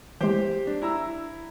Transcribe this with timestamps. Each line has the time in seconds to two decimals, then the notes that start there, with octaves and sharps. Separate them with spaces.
0.21 E3 G#3 G4 C5 G5
0.67 D4
0.82 E4 A#5 E6